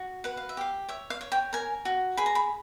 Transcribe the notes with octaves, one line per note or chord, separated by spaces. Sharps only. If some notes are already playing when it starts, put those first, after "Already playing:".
Already playing: F#4
B4 F#5
F5
E5
G4 F5
C#5 E5
F5
C#5
G5
A#4 G#5
F#4
G#4 B5
A#5
B5